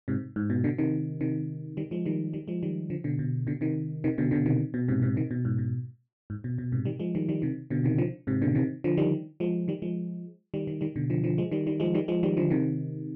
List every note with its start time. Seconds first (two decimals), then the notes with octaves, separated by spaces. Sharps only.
0.08 G#2 C3
0.36 G#2
0.50 B2
0.64 B2 D3
0.78 C3 D#3
1.21 C3 D#3
1.77 D#3 G3
1.91 F3 G#3
2.05 D#3 G3
2.33 D#3 G3
2.48 F3 G#3
2.63 D#3 G3
2.90 D3 F3
3.04 B2 D3
3.19 B2
3.47 B2 D3
3.61 C3 D#3
4.04 C3 D#3
4.18 B2 D3
4.31 B2 D3
4.46 C3 D#3
4.74 B2
4.88 G#2 C3
5.02 G#2 C3
5.16 C3 D#3
5.31 B2
5.45 G#2
5.58 B2
6.30 G#2
6.44 B2
6.58 B2
6.72 G#2 C3
6.85 D#3 G3
7.00 F3 G#3
7.15 D#3 G3
7.29 D#3 G3
7.42 C3 D#3
7.70 B2 D3
7.84 C3 D#3
7.98 D3 F3
8.27 G#2 C3
8.42 B2 D3
8.55 C3 D#3
8.84 D3 F3
8.97 D#3 G3
9.40 F3 G#3
9.68 D#3 G3
9.82 F3 G#3
10.54 D#3 G3
10.67 D#3 G3
10.81 D#3 G3
10.96 B2 D3
11.10 D3 F3
11.24 D3 F3
11.38 F3 G#3
11.51 D#3 G3
11.67 D#3 G3
11.80 F3 G#3
11.94 D#3 G3
12.08 F3 G#3
12.23 D#3 G3
12.37 D3 F3
12.50 C3 D#3